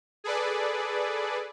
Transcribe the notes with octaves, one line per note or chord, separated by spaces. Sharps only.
G#4 A4 B4 D5